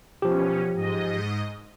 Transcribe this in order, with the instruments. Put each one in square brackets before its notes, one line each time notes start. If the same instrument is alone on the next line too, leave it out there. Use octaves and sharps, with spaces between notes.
[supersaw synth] B2 C#4 [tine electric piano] F3 G4
[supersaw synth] G#2 D#5